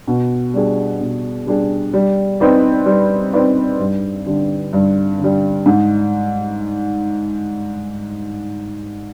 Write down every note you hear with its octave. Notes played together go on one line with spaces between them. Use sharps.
B2
G3 D4 G#4
B2
G3 D4 G#4
G3
C4 D#4 B4 D5
G3
C4 D#4 B4 D5
G2
D3 G3
G2
D3 G3
G#2